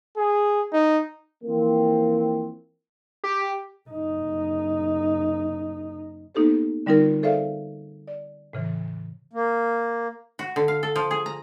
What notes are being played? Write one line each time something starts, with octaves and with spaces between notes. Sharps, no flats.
G#4
D#4
E3 F3 A#3 C4
G4
F#1 D#4
A#3 B3 D#4 G4 A4 C5
D3 G3 C4 D#4 F4 A#4
G#4 A4 C5 D5 E5 F5
D5
A2 C#3 E3
A#3
F#4
D3
F5
A4
F3
G#4
A#5